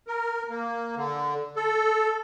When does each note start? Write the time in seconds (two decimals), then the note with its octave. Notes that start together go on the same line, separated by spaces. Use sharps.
0.07 A#4
0.50 A#3
0.97 D3
1.56 A4